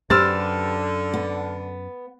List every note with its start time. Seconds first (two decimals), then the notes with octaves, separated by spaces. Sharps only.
0.10 F#2 D3 G4 B4 C5 E6 F6 A6
1.14 B3